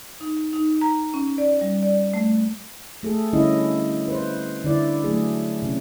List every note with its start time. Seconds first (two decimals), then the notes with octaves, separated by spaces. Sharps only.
0.21 D#4
0.53 D#4
0.81 A#5
1.14 C#4
1.38 D5
1.61 G3
1.83 D5
2.14 A3
3.03 A3 G#4 A4
3.33 D3 G3 C#4 E4 D#5
4.08 B4 C5
4.64 D3 E4 D5
5.04 F#3 A3 G#4
5.62 C3 C#4